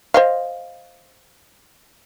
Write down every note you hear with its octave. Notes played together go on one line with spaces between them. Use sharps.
C5 D#5 F5